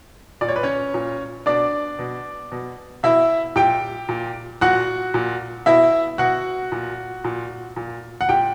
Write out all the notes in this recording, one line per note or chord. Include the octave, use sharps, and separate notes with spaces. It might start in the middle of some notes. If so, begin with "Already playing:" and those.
A#2 D5
C#5
B4
C#4 C#5
A#2
B2 D4 D5
B2
B2
B2 E4 E5
A#2 G4 G5
A#2
A#2 F#4 F#5
A#2
B2 E4 E5
B2 F#4 F#5
A#2
A#2
A#2
F#5
A#2 G4 G5